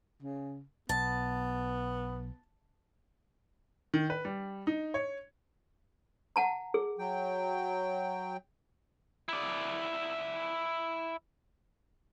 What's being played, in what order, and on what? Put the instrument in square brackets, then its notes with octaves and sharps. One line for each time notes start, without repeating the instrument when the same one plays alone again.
[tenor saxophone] C#3
[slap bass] B1 [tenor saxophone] B3 [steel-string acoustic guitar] A5
[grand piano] D#3
B4
G3
D#4
C#5
[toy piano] F#5 A5 A#5
G#4
[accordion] F#3 G5
[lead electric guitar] E4 D5